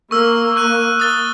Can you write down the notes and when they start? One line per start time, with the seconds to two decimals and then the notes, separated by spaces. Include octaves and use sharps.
0.11 A#3 C#6 E6 F6
0.56 C#6 F#6 D#7
1.00 D#6 A6 G7